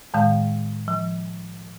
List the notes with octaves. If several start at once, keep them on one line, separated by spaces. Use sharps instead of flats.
A2 D#3 G#3 F5
F3